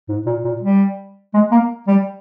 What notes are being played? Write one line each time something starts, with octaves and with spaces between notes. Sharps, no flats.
G#2
A#2
A#2
G3
G#3
A#3
G3